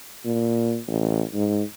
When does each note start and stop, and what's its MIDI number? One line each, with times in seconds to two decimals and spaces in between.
0.25 0.79 46
0.88 1.22 33
1.34 1.62 44